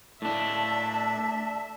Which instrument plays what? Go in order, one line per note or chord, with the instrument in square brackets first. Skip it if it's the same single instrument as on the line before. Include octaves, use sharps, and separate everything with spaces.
[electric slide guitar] A2 D4 [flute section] D5 A5 [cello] E5